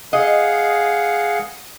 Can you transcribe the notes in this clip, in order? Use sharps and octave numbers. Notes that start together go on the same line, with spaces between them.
G#4 D#5 F5 F#5